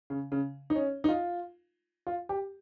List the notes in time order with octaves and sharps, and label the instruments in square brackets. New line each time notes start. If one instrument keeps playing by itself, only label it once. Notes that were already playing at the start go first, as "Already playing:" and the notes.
[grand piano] C#3
C#3
D#4
C#4
D#4
F4
F4
G4